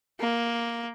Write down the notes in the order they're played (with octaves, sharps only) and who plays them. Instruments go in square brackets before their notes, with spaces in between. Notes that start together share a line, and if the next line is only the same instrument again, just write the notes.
[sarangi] A#3